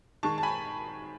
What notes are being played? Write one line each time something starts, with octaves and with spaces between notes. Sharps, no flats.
D#3 G#3 A5 C#6
A5
G#5 B5